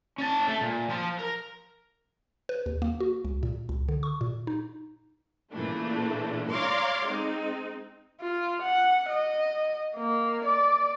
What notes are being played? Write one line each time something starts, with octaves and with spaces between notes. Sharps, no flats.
C#4 A5
A3
A#2
F3 C6
A#4
B4
D#2
A#3
F#4
C#2
A#2
C#2
D3
C#6
A#2
D#4
A#2 C#3 E3 A3 D4
C#5 D5 F5 A#5 C6 D6
G#3 C4 D#4
F4
F#5
D#5
A#3
D5